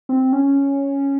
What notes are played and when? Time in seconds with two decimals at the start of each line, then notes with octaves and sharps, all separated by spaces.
0.09 C4
0.33 C#4